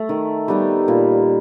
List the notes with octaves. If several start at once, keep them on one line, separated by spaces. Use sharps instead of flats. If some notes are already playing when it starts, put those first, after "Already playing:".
Already playing: A3
D#3
G3 B3 D#4
A#2